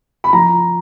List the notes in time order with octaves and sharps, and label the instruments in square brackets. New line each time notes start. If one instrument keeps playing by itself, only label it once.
[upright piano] B5
F3 A#5